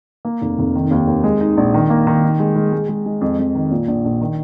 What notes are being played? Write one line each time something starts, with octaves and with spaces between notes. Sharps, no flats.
A#3
F1
F1
D#3
D#2
D#2
G#3
D#4
A#1
D#3
A#3
D#3
D#4
G#3
G#3
G#3
G#3
G#3
F2
F2
D#3
A#2
A#1
A#1
D#3